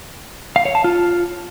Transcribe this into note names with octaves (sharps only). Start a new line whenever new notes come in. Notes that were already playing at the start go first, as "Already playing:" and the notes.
F5
C#5
A5
F4